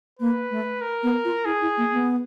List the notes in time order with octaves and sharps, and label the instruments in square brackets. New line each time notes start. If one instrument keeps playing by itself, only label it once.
[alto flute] A#3 [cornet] B4
[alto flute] A3
[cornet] A#4
[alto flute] B3
F4
[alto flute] E4 [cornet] G#4
[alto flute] E4
A#3
B3